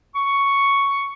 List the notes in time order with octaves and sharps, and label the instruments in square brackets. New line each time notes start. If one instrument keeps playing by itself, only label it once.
[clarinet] C#6